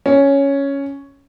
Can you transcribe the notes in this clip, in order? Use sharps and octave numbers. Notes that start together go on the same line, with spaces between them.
C#4